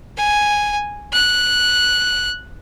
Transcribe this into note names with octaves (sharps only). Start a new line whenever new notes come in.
G#5
F#6